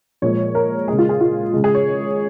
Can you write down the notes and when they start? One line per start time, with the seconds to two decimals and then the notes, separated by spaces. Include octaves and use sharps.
0.22 A#2 F3 G#3 C#5
0.55 A#4
0.88 C#3 G#3 G#4
0.98 F4
1.09 G#4
1.21 F4
1.53 C#3 G#3
1.64 G#4
1.75 C#5